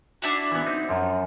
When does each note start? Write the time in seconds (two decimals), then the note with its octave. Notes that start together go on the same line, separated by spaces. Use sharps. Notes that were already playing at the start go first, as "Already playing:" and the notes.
0.22 D4 E4 F#4
0.52 E3 B3
0.66 C4 D#4
0.89 F#2 F3